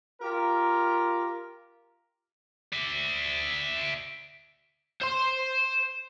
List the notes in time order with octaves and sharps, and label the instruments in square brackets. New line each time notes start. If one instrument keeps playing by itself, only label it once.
[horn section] F4 G4 A#4
[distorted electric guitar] D5 E5
[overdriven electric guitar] C5 C6